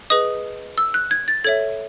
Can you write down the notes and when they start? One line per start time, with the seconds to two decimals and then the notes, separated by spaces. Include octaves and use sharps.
0.10 G#4 B4 D#5 D#6
0.78 E6
0.94 F#6
1.11 G#6
1.28 A6
1.44 A4 C#5 E5 G#6